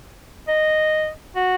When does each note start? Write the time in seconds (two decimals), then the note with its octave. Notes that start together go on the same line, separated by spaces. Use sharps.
0.48 D#5
1.36 F#4